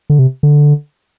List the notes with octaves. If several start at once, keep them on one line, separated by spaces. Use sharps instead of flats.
D3
C3
D3